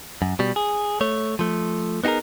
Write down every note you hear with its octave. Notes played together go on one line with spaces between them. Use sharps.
F#2
B2 G3
G#4
A3 C#5
F3 A3
B3 D#4 F#4 G#4 A#4